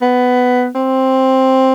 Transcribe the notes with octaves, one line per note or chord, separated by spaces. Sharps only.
B3
C4